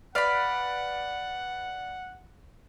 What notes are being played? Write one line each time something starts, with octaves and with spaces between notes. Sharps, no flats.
B4 D5 F5 F#5 B5